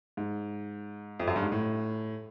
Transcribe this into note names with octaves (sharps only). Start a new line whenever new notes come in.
G#2
F2
F#2
G2
G#2
A2